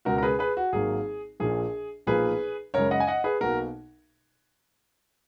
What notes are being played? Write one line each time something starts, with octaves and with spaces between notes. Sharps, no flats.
C#2 B2 G#3 F#4 A#4
A#4
G#4 B4
G#4 B4
F#4
G#1 G#2 F#3 A#3 G#4
A#1 A#2 F3 G#4
B1 A#2 F3 A#3 G#4 B4
F#2 C#3 G#3 A#4 C#5
D#5 F#5
G#5
D#5 F#5
G#4 B4
B1 B2 A#3 F#4 A#4